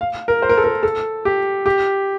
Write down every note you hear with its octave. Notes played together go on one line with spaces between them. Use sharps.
F5
A#4
C5
A#4
A4
A#4
A4
G4
G4